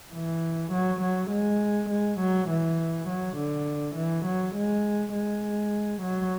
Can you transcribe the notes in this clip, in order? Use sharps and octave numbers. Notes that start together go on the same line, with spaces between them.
E3
F#3
F#3
G#3
G#3
F#3
E3
F#3
D3
E3
F#3
G#3
G#3
F#3